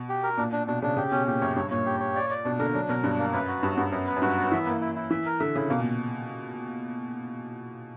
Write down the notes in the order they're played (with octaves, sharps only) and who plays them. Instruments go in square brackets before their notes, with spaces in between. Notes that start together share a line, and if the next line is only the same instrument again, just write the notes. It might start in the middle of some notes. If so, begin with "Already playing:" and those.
Already playing: [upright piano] B2
[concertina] G4
A#4
[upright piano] A#2 [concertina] D4
[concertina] D4
[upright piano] B2 [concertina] D4
[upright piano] C#3 [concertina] D4
[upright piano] C#3 [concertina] G4
[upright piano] B2 [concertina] C#4
[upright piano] A#2 [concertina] G4
[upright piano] F#2 [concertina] C#5
[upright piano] G2 [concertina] C#5
[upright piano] A#2 [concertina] C#5
[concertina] G4
C#5
D5
D5
[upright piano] B2 [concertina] D4
[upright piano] D3 [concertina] A#4
[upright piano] F#3 [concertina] D4
[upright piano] B2 [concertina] A#4
[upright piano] G2 [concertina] D4
[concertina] A#3
[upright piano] F#2 [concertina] B4
[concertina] F#4
[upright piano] G2 [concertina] B3
[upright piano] G2 [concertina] B3
[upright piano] F#2 [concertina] B3
[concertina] B4
[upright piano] F#2
[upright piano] G2 [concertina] F#4
[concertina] B3
[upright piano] E3 [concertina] E5
[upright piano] A#3 [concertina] E4
[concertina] E4
E4
[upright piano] E3 [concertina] E5
[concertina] A#4
[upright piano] D3 [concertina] E5
[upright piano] C#3 [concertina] E4
[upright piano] B2 [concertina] A#3
[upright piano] A#2